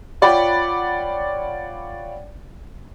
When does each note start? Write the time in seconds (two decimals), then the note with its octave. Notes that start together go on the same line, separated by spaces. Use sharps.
0.22 F4 C#5 D5 F#5 G5 B5